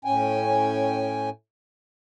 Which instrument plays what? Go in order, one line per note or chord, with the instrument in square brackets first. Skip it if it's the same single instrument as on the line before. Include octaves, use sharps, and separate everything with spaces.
[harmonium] A2 C#4 G5 G#5